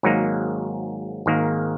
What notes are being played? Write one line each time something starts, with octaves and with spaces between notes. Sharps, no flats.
G#1 G#2 F#3 A#3 D#4
G#1 G#2 D#3 A#3